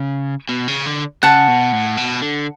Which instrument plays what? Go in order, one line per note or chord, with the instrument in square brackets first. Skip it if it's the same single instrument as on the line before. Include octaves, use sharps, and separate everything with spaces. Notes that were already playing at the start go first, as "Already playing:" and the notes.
Already playing: [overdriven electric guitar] C#3
B2
C#3
D3
[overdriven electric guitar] C#3 [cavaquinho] F#5 A5
[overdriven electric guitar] B2
A2
B2
D3